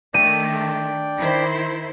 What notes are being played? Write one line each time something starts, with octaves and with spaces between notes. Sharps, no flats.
D#3 A3 D4 D5 G5 D#7
D#3 E4 C5